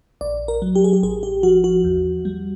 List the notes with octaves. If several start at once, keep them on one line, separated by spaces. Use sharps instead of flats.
A#1 D5
A#4
F#3
G4
G#4
G4
A1 G#4
G4
F3 F#4
F#4
E2
G3